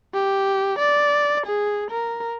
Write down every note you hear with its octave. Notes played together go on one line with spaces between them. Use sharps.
G4
D5
G#4
A#4